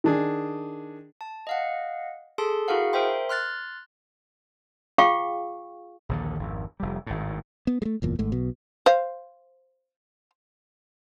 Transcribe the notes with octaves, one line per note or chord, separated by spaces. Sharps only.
D#3 D4 G#4
A5
D#5 F5 F#5
G#4 A4 A5 C6
E4 F#4 G#4 A#4 F5 F#5
A#4 C5 E5 G5 C6
C6 F6 F#6 A6
F4 G#4 F5 G5 C#6
A#1 D#2 D3
G#1 F2
F1 G3
G#1 A2
B3
G#3 A3
F#1 E2 A#2
G#1 G#2 A3
B1 B2
C5 F5